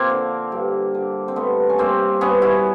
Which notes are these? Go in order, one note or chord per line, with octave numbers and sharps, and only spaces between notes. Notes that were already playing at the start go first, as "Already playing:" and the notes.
Already playing: F3 A#3 C4
D3
G2
D3
C4
G2 A3 B3
C#4
G2 A#3 C4
G2 B3 C#4
E4 F#4